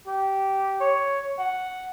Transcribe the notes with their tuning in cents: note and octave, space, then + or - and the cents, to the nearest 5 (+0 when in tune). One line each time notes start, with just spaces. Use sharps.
G4 -15
C#5 +5
F#5 +0